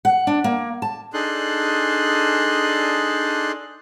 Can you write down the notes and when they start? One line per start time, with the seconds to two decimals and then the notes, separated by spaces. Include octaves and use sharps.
0.05 F#5
0.27 D4
0.44 A#3
0.82 A5
1.14 D4 D#4 G#4 A4 C6 F#6